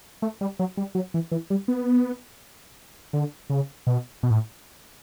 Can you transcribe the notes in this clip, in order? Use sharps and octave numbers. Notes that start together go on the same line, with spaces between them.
A3
G3
F#3
G3
F#3
E3
E3
G3
B3
D3
C#3
B2
B2
A2